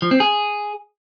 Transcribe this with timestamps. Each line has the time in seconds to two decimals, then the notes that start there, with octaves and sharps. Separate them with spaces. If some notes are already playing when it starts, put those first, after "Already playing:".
0.02 F3
0.11 C4
0.20 G#4